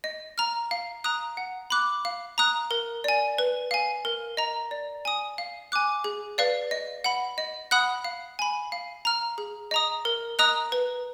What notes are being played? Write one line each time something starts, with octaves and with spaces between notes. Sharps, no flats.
D#5
A#5 F6
F5
A#5 D#6 F#6
F#5
B5 D6 F#6
F5
A#5 D#6 F#6
A#4
D5 G#5
B4
F5 G#5
A#4
D#5 A#5
D5
G#5 D#6
F5
G#5 D6 F#6
G#4
B4 D5 F5
D#5
F#5 B5
D#5
F#5 B5 D#6 F#6
F5
G#5 B5
F5
A#5 F6
G#4
D#5 A#5 D#6
A#4
D#5 A#5 D#6 F#6
B4